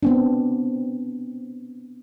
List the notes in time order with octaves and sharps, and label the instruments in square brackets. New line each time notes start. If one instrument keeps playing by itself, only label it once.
[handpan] B3 C4 D4